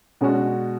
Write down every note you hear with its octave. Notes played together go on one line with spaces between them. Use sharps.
B2 G#3 C#4 D4 F#4